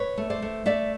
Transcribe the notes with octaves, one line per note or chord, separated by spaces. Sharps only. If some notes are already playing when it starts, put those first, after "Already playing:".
Already playing: B4 C#5
A3
C5 D5
A3
A3 D5 E5